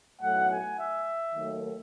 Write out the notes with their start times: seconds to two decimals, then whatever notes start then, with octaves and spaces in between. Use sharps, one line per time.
0.21 B1 A2 F#3 F#5
0.49 G#5
0.77 E5
1.34 D#2 D#3 F#3 A3